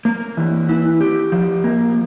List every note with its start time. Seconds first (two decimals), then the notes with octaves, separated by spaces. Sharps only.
0.05 A#3
0.37 E3
0.69 E4
1.01 G4
1.32 F3
1.64 A#3